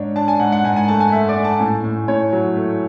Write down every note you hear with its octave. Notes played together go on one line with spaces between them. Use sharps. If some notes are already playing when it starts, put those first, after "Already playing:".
Already playing: G#2 D4 C#5
D4 A5
G#5
G#2 F#5
F#5
G#2 G#5
G#5
A3 A5
G#5
A3 E5
D5
A3
A5
A2 G#5
A2
A2 C#5
F#3
A3